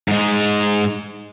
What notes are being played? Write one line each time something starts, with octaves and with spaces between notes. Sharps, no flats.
G#2 G#3